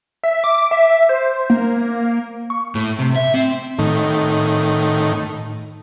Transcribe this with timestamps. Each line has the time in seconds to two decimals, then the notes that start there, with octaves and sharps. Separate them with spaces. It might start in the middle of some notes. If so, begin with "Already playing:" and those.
0.23 E5
0.44 D6
0.71 E5
1.09 C5
1.50 A#3
2.50 C#6
2.75 A2
2.99 C3
3.16 E5
3.34 C4
3.79 A2 D#3